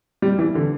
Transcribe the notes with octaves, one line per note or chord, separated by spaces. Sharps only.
G3
E3
D3